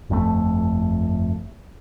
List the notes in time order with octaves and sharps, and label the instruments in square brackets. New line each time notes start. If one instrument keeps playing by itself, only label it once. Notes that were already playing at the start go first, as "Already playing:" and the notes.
[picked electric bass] G1 F2 C#3 A3